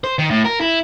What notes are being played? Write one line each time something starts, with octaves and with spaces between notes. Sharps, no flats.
C5
D#3
A2
A#4
E4